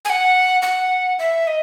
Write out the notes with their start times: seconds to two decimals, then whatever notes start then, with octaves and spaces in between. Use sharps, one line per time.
0.05 G#5
0.10 F#5
0.62 F#5
1.19 E5
1.47 D#5